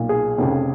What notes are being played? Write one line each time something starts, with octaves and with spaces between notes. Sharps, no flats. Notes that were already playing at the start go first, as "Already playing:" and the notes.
Already playing: B1 A#2
G#4
F1 F2 C#3